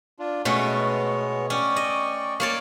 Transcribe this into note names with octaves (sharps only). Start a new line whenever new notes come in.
D4 F4
B2 G#3 A3 B3 C#4 C#5
C#4 D5 G5 C#6
D#5
A#3 C#5 D5